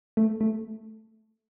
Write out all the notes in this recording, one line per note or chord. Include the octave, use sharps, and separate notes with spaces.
A3
A3